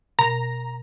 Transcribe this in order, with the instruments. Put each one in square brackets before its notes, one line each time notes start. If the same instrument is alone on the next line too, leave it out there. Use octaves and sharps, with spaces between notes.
[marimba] B2 [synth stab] A#5